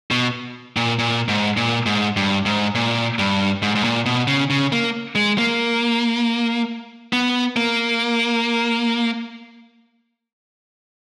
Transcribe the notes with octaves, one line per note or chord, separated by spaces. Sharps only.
B2
A#2
A#2
G#2
A#2
G#2
G2
G#2
A#2
G2
G#2
G#2
A#2
B2
C#3
C#3
A#3
G#3
A#3
B3
A#3